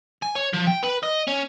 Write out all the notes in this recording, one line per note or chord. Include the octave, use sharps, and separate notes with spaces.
G#5
C#5
F3
G5
B4
D#5
C#4